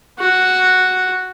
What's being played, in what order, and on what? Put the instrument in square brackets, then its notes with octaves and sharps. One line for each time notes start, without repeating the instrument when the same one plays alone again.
[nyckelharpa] F#4